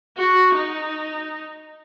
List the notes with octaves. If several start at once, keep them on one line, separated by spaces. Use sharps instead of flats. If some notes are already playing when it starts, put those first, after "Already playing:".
F#4
D#4